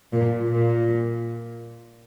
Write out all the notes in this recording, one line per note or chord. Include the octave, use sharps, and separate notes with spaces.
A#2
A#2